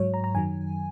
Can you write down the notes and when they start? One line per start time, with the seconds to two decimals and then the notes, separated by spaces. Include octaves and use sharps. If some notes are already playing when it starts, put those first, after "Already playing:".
Already playing: G#2 F#3 C#5
0.14 A#5
0.24 A#5
0.35 F#2 D#3 F#3 G#5